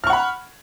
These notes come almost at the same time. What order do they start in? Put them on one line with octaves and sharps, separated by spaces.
F6 C#6 F#5 B5